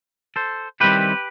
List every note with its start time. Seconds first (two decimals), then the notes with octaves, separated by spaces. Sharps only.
0.36 A4 C5
0.80 D#3 G3 C4 E4 G4 B4